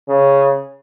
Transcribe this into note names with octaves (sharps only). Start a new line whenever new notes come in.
C#3